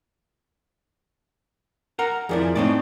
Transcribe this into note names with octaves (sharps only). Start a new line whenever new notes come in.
A#4 F#5 A#5
F2 F3 E4 G#4 A#4 D5
A2 C4 D#4 D5